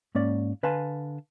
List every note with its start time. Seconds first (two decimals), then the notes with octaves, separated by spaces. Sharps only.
0.15 G#2 A#3 C#4 D5
0.63 D3 B4 F5 G#5 A5 C6